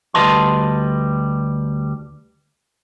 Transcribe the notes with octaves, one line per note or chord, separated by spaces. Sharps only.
D2 G3 B4 D#5 A5 C6